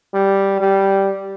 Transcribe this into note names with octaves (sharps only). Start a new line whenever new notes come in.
G3
G3